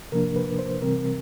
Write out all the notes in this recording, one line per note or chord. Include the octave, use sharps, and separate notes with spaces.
C3 F3 A#3 D4 A#4
B4
C5
C3 E3 G3 C4 A#4